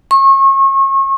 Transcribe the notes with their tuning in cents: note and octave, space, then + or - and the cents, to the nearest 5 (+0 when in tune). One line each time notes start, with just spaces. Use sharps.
C#6 -35